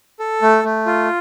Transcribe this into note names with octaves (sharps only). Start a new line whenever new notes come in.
A4
A3
A3
F4